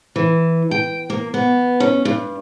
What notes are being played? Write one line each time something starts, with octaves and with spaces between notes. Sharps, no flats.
E3
G5
A#3
B3
C#4
G2